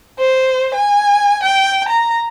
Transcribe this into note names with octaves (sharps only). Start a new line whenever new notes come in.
C5
G#5
G5
A#5